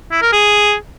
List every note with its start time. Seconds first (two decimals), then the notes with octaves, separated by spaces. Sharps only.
0.12 E4
0.22 A#4
0.33 G#4